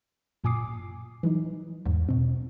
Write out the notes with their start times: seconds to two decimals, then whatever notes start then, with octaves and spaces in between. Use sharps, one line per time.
0.44 F#2 A#2 G#5 D6 D#6 C7
1.23 E3 F#3 D#4
1.85 E2 G#2
2.09 B2 C4